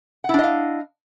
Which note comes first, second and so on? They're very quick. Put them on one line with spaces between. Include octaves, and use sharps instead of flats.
F#5 E4 D4 D#5 F5